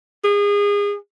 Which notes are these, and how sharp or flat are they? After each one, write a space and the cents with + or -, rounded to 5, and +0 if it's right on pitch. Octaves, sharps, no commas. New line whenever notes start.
G#4 -30